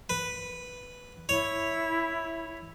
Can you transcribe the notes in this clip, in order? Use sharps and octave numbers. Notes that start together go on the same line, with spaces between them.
B4
E4 C#5